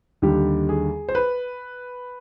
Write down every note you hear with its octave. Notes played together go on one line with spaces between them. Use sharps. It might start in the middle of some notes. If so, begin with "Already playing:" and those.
D#2 D3 G3 G4
G#4
C5
B4